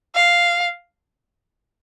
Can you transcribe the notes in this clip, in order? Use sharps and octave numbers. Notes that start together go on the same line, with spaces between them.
F5